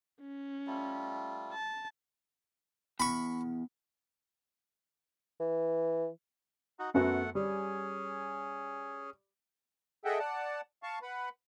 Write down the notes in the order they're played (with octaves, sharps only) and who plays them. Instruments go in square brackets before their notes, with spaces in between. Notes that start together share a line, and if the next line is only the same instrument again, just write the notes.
[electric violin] C#4
[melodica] G3 A3 F4
[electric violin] A5
[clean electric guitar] E2 [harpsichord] B5 C#6
[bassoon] E3
[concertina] D#4 F#4
[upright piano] F#2 B3 F#4 [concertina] A3 F#5
[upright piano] G3 [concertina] C#4 G#4
[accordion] G#4 A4 D#5 E5 F#5 G5
D5 F#5 A5
F5 A5 C#6
B4 F#5 B5